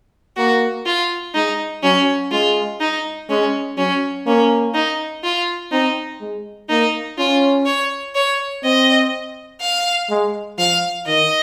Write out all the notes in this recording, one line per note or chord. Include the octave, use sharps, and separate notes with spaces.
A#3 F#4
F4
G#3 D#4
F#3 C#4
G#3 F4
D#4
G#3 C#4
F#3 C#4
A#3 C#4
D#4
F4
C4 D#4
G#3
A#3 D#4
C#4 F4
C#5
C#5
C4 D#5
F5
G#3
F3 F5
D#3 D#5